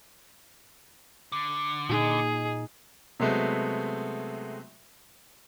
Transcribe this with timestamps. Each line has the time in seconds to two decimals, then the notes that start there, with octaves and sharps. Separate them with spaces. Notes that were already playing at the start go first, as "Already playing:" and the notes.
1.32 D3
1.89 A#2 D#4 G#4
3.20 C3 F#3 G#3 A3 B3 C4